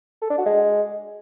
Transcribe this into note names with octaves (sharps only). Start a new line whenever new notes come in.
A4
D4
F#4
G#3